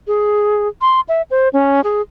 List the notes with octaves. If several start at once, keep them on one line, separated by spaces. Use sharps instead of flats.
G#4
C6
E5
C5
C#4
G#4